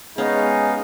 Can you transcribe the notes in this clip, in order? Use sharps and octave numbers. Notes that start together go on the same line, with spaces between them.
G#3 B3 C#4 D#4 F5